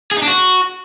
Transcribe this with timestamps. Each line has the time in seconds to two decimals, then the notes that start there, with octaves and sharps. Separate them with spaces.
0.11 G#4
0.17 D#4
0.22 D4
0.28 F#4